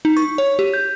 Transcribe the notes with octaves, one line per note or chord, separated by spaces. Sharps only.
D#4
C#6
C#5
G4
G6